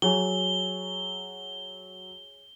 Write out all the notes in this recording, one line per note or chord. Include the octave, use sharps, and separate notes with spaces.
F#3 G#4 C#5 G#5 G7